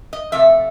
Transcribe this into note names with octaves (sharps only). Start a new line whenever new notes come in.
D#5
C3 F3 A3 E5